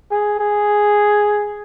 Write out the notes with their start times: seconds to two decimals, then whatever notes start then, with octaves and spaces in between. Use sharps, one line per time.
0.11 G#4
0.39 G#4